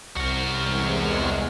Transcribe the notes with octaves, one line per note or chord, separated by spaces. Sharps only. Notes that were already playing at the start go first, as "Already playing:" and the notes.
C2 F#4 A#4
E2 G#3